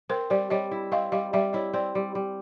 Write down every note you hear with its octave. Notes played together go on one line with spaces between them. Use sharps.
C4 A#4 C5
G3 C5 D5
G3 C#5 D#5
E4
C4 D#5 F5
G3 D#5 F5
G3 D5 E5
E4 C#5 D#5
C4 C5 D5
G3
G3